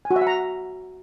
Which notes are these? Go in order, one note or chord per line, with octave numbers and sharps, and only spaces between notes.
G#5
F#4
E5
F#5
A#5